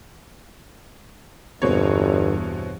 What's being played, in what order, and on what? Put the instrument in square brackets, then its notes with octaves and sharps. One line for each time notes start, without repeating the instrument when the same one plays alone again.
[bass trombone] G1 [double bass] E2 G2 [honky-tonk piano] B2 C4 C#5